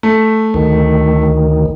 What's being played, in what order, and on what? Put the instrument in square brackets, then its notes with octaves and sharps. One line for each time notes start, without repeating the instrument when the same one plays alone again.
[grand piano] A3
[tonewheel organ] D2 D#3